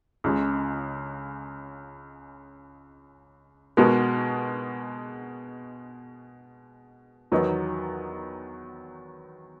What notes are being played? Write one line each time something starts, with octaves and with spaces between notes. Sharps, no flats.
C#2 C#3 G#3
B2 G#3 B3 F#4 A#4
E2 D#3 F#3 B3 D#4